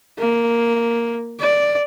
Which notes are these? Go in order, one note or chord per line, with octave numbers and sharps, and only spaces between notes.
A#3
D5